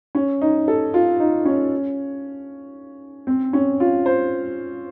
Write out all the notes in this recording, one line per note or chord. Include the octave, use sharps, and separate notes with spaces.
C#4
D#4
A4
F4
D#4
C#4
C4
C#4
F4
C5